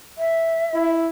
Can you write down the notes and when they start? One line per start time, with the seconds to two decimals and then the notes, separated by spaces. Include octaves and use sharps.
0.18 E5
0.74 E4